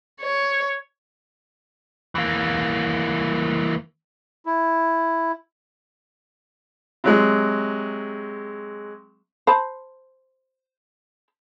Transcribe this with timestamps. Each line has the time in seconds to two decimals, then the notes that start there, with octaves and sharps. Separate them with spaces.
0.21 C#5
2.15 E3 A#3
4.46 E4
7.04 C3 F#3 G#3
9.47 C5 A5 B5